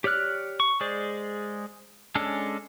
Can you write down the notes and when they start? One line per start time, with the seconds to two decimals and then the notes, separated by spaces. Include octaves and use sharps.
0.04 G4 C#5 D5 F6 F#6
0.60 C#6
0.81 G#3 G#4 C5 D5
2.15 G#3 C#4 D4 A4